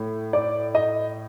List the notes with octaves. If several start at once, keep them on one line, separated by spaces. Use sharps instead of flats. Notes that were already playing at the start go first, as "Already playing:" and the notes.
Already playing: A2
D5
D#5